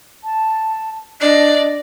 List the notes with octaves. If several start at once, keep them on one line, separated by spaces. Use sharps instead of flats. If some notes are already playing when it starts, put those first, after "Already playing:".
A5
D4 D5 D#5